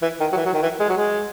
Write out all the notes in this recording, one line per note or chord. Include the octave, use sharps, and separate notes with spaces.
E3
D#3
F#3
E3
F#3
D#3
E3
G#3
F#3
G#3